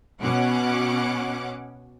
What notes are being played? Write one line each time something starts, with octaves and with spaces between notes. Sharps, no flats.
B2 C#4 F#5 D6